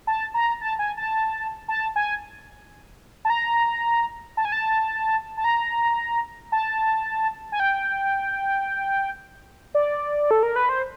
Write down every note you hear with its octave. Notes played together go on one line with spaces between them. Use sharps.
A5
A#5
A5
G#5
A5
A5
G#5
A5
A#5
A5
G#5
A5
A5
A#5
A5
G#5
G5
D5
A4
A#4
B4
C5